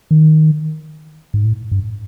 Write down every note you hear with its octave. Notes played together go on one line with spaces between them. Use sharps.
D#3
G#2
A2
G2